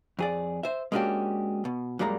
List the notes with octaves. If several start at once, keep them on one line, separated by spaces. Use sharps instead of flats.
F2 G#4 D5
C5 E5
G#3 A#3 C#4 D4 F#4 G4
B2
F#2 A#2 G3 G#3 A#3 A#5